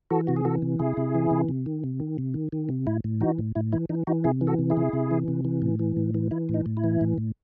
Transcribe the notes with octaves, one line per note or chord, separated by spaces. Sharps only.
E3 F#4 A4
C3 F#4
G#4
E3 F#4 A4
C3
C3 E4 G#4
C3
E3
C3
C3
D#3
C3
D#3
C3
D#3
D#3
C3
A2 E4
A2
E3 D#4 F#4
A2
A2 E4
E3 E4
E3 D#4
E3 D#4 F#4
C3 E4 G#4
E3
F#4 A4
C3
E4 G#4
C3
C3
E3
C3
E3
A2
E3
A2
E3
E3 E4
A2
D#4
A2
E4
E3
A2
A2